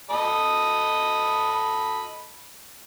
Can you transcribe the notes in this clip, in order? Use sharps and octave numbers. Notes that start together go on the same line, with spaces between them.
A4 D#5 B5